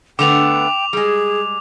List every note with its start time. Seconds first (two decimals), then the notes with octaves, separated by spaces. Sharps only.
0.19 D3 A3 B3 G5 D6 F7
0.93 G3 G#3 G#4